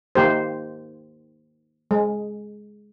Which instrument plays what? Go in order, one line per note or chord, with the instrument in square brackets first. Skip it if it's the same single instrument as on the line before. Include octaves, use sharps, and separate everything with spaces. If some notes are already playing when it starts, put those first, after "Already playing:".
[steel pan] D#3 A#3 G4 C5
G#3